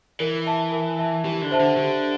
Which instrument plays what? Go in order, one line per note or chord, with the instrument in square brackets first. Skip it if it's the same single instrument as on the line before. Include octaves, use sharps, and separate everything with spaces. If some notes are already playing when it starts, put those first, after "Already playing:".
[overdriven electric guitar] E3 [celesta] A#4
[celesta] E5 A5
A#4
E5 A5
[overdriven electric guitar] E3 [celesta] G4
[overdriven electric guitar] D3
[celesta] C5 E5 A5
[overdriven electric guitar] D3
[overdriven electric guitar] D3 [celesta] G4